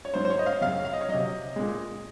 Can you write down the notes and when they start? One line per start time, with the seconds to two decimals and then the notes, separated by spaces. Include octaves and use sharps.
0.05 C#5
0.14 G#2 F#3 C5
0.25 C5
0.30 C#5
0.39 D#5
0.46 F5
0.61 F#2 C#3 F#3 F5
0.85 F5
0.93 D#5
1.01 C#5
1.09 C3 F#3 D#5
1.56 A#2 G#3